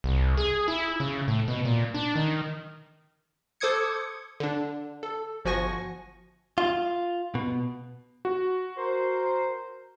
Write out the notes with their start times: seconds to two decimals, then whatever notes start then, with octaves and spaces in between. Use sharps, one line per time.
0.04 C2
0.37 G#4
0.68 E4
1.00 C#3
1.28 A2
1.48 B2
1.65 A#2
1.94 D4
2.16 D#3
3.60 A4 C5 D6 D#6 G#6 C#7
4.40 D3 D4
5.03 A4
5.45 G1 F3 F#4 G#5 C#6 A#6
6.58 F4
7.35 B2
8.25 F#4
8.78 A#4 C5